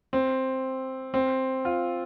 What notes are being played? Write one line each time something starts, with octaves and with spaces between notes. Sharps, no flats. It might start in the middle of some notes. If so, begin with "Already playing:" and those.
C4
C4
F4